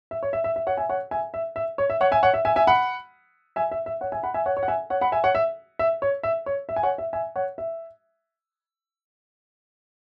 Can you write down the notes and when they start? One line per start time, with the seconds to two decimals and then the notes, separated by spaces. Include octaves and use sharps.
0.11 E5
0.23 C#5
0.33 E5
0.44 E5
0.56 E5
0.67 C#5 F#5
0.77 E5 G#5
0.89 C#5 F#5
1.11 E5 G#5
1.34 E5
1.56 E5
1.78 C#5
1.90 E5
2.01 C#5 F#5
2.12 E5 G#5
2.23 C#5 F#5
2.34 E5
2.45 E5 G#5
2.56 E5 G#5
2.67 F#5 B5
3.56 E5 G#5
3.72 E5
3.86 E5
4.01 C#5 F#5
4.12 E5 G#5
4.23 F#5 B5
4.34 E5 G#5
4.46 C#5 F#5
4.57 C#5
4.63 F#5
4.68 E5 G#5
4.90 C#5 F#5
5.01 F#5 B5
5.12 E5 G#5
5.24 C#5 F#5
5.35 E5
5.79 E5
6.02 C#5
6.23 E5
6.46 C#5
6.69 E5
6.76 G#5
6.83 C#5 F#5
6.98 E5
7.13 E5 G#5
7.36 C#5 F#5
7.58 E5